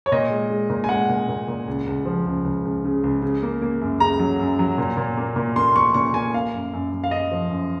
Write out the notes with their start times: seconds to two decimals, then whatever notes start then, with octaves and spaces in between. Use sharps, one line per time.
0.06 C#5
0.12 A#2 D#5
0.30 G#3
0.50 G#3
0.70 A#2
0.84 G#5
0.89 G#3 F#5
1.09 A#2
1.29 A#2
1.48 A#2
1.68 C#2
1.87 C#2
2.05 F3
2.26 C#2
2.44 C#2
2.65 C#2
2.84 C#3
3.04 C#2
3.22 C#3
3.43 A#3
3.62 A#3
3.81 F#2
4.00 C#3 A#5
4.19 F#3
4.39 F#2
4.59 F#3
4.78 A#2
4.97 A#2
5.17 A#3
5.36 A#2
5.56 A#3 C6
5.75 A#3 C#6
5.94 A#2 C#6
6.14 A#3 G#5
6.34 A#3 F5
6.54 F#2
6.73 F#2
6.91 F#2
7.04 F5
7.11 F#2 D#5
7.31 F3
7.50 F#2